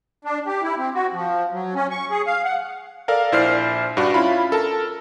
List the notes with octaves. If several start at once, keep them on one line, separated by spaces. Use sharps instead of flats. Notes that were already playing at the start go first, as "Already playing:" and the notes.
D4
G4
E4
C4
F#4
F3
F#3
C#4
C#6
G#4
F5
F#5
A4 A#4 D5 F5
A#1 E4 C5 D5 F6 C7
G2 D4 F#4
C#4 E4 F4 B5
A4 A#4 A5